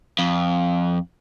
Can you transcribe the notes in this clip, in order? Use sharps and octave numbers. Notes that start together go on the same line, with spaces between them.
F2